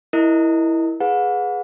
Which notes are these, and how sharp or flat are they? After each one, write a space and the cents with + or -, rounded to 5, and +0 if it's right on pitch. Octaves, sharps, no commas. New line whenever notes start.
E4 +0 A#4 +0 D#5 +0
G#4 +0 B4 +0 F#5 -40